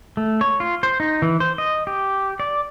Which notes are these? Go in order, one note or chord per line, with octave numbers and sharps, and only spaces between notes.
A3
C#5
F4
C5
D#4
E3
C5
D#5
G4
D5